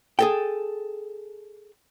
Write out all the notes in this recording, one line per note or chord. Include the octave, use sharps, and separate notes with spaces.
G#4 A4 G5